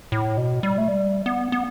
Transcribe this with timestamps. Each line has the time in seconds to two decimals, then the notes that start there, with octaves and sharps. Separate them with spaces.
0.12 A2
0.37 B2
0.63 G3
0.78 A3
0.88 G3
1.26 B3
1.52 B3